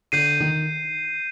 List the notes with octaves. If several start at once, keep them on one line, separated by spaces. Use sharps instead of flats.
D3 G6 C7 D#7
D#3